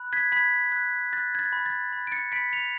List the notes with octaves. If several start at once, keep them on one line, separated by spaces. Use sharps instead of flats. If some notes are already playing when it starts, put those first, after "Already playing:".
Already playing: B5 F#6
G#6 B6
B5 G#6 B6
F#6
F#6 A6
G#6
A6
B5
A6
B5
D7
A6 C#7
B5 B6 D7
C#7 F7